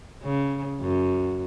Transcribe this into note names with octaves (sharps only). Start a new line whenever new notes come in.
C#3
F#2